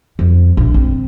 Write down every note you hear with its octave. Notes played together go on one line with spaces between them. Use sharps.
F2
A#1
C4